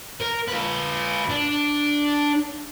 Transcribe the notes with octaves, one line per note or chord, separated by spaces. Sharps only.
A#4
F4 B4
D4